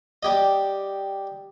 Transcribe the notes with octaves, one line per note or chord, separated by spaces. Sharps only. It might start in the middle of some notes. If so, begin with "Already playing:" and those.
G3 G4 D#5